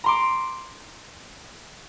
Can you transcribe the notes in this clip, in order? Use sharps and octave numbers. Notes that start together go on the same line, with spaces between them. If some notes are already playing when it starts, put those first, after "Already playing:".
A#5 C6 D6